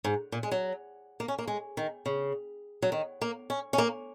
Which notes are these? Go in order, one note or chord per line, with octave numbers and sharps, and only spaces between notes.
G#2
A#2
G#3
F#3
A#3
C#4
A#3
G#3
D#3
C#3
F#3
D#3
A#3
C#4
C#4
A#3